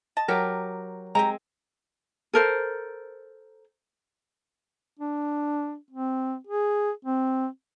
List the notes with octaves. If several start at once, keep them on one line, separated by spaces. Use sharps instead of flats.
D#5 A5
F#3 G4 A#4
G#3 C4 G4 G#5 A#5
A4 A#4 C5
D4
C4
G#4
C4